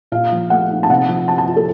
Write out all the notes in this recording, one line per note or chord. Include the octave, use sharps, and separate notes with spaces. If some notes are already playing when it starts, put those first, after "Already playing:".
A#2 F5
F3
A3 F#5
D#4
A5
C3 F#5
F3
C4 A5
A5
F4
A4